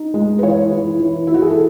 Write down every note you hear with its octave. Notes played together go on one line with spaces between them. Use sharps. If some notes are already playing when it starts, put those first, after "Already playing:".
Already playing: D#4
G#3
B4
E3 C#5
E3
E3
E3 E4
F#4
G#4
A4